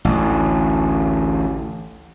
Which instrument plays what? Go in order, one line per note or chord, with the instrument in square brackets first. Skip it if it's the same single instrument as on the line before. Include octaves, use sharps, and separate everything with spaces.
[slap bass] A1 D2